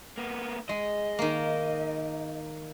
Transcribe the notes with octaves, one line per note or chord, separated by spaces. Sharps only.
A#3 B3
G#3 D#5
D#3 A#3